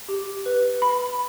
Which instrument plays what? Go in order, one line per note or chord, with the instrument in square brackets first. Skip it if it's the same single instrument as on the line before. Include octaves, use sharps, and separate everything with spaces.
[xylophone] G4
B4
B5